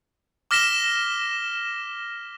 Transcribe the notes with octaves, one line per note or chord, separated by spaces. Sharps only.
D6 F6 A#6 B6 E7 G7